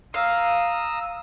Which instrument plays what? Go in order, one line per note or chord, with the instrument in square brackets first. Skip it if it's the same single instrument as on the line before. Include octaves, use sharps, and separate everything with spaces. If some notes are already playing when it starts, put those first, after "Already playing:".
[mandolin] F5 [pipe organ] A#5 D#6 E6